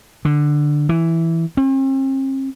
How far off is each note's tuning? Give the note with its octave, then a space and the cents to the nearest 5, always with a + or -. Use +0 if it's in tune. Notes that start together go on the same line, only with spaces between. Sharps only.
D3 +10
E3 +0
C4 +45